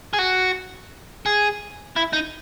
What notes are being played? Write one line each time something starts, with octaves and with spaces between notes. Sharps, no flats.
G#4
F#4
G#4
E4
D#4